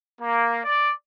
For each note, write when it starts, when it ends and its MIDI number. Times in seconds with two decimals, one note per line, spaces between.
0.21 0.61 58
0.64 0.92 74